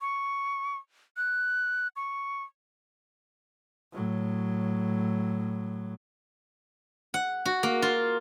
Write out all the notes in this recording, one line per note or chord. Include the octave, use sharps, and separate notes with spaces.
C#6
F#6
C#6
A2 F#3
F#5
F#4
A#3
F4